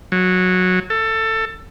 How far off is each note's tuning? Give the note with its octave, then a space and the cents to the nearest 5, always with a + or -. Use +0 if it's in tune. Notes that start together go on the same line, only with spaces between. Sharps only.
F#3 -15
A4 +20